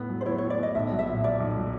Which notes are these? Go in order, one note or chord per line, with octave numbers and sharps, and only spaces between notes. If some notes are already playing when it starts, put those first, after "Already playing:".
Already playing: A2 B3 B4
F#3
C5
E4 C#5
A2 C#5
D5
B3 D#5
B1 E5
F#3
E5
A#2
A#3 D5
B1
F#3